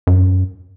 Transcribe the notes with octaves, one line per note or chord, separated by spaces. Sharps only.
F#2